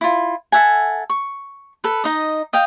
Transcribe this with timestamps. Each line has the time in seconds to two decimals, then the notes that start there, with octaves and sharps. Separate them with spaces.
0.01 E4 F4
0.52 A4 E5 F#5 G#5
1.10 C#6
1.84 A4 B4
2.04 D#4 D#5
2.53 D#5 F5 G5